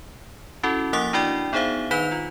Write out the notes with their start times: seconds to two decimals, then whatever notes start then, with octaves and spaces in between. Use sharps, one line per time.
0.63 C#4 E4 F#4 A4
0.93 F3 A#3 F#5 D6 D#6 A6
1.13 D4 E4 F#4 D5 G5
1.53 B3 D#4 G#4 C5 E5 F5
1.91 D#3 D#4 B4 G6 B6 F7
2.12 F4